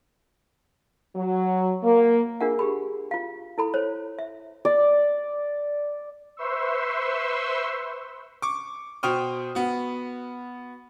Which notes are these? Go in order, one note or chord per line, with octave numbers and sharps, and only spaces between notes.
F#3
A#3
D4 F4 G#4 A#4 E5 F#5
G4 G#4 B5
F4 F5
E4 A4 B5
C5 C#5
E5
D5
B4 C5 E5 C6 C#6 E6
C#6 D6
B2 C5 G5 C#6 D#6 F6
B3 F#4